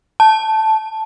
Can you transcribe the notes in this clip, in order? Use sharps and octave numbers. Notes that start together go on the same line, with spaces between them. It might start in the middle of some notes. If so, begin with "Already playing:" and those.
A5